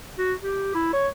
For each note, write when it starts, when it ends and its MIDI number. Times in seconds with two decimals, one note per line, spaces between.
0.18 0.33 66
0.42 0.73 67
0.74 0.88 64
0.93 1.08 73